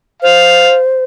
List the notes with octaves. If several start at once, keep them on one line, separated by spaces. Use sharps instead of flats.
C5 F5